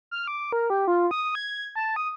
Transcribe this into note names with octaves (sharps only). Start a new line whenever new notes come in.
F6
D6
A#4
G4
F4
D#6
G#6
A5
D#6